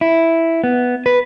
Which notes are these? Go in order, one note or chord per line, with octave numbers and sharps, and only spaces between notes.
E4
B3
B4